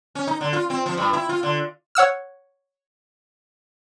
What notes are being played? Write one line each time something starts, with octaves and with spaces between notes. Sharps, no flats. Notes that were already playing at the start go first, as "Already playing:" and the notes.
C#4
D#4
D3
F4
C4
F3
G2
E4
F4
D3
C#5 F#5 E6 F6